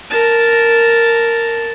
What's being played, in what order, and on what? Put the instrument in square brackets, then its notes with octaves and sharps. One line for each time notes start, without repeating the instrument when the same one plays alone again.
[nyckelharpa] A#4 A5